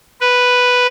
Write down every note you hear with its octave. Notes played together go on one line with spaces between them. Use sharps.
B4